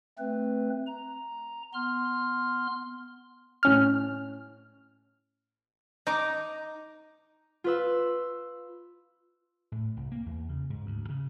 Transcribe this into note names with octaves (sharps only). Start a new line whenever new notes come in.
A3 C4 B4
A#5
B3 C6 F6
A2 C#4 F6
D#4 D#5 A#5 D6
F4 B4 E6
A2
C2
A#3
E2
C#3
G#2
D2
C#3